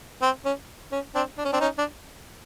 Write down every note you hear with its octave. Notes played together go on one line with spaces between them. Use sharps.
C4
C#4
C#4
C4 D4
D4
C#4
C4 D4
C#4 D#4
D4